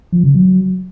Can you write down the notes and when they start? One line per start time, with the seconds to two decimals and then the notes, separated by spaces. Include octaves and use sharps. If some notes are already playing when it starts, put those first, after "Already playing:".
0.13 F3
0.24 C#3
0.35 F#3